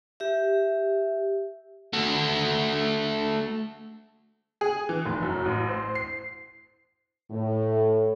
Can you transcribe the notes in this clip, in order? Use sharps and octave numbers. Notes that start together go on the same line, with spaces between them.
G4 E5
A3 F#4
G#4
E3
F1
F#2
A1
C5
C7
A2